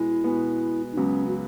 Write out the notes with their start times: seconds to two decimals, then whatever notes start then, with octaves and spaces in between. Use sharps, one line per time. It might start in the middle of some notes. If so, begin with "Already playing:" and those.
Already playing: B2 G#3 B3 E4
0.24 B2 G#3 B3
0.92 D#4
0.97 C#2 C#3 F#3 B3 C#4
1.28 F#4